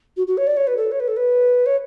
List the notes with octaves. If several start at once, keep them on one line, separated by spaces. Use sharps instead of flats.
F#4
F#4
C#5
D5
C#5
B4
A4
C#5
B4
A4
B4
C#5